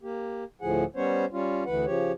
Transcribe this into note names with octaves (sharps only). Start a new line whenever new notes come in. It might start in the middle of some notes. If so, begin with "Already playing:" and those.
A#3 G4
D2 A2 F3 G#4 F#5
G3 B3 C#4 C5 C#5
G3 C#4 F4
D2 E3 B4 F#5
C#3 F3 G4 C#5